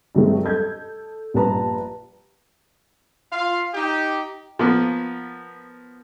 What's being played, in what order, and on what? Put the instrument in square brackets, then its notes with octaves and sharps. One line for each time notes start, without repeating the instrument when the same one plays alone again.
[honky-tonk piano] G2 C3 D#3 F#3 G#3 A3
A4 D#5 G6 G#6
A#1 G2 B4 A5 A#5
[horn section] F4 F5
D#4 G4
[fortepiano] F3 A#3 B3